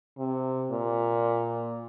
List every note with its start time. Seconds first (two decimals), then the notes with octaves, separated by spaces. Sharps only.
0.18 C3
0.71 A#2